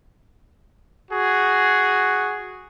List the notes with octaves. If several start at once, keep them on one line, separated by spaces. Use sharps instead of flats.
F#4 G#4